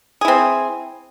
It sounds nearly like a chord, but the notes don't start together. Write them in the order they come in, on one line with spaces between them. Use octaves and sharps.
G#4 E4 C4